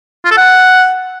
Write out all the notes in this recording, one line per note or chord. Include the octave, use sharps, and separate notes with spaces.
F4
A4
F#5